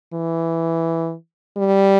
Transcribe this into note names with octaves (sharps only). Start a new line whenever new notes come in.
E3
G3